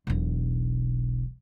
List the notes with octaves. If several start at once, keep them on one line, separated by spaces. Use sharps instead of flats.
E1 B1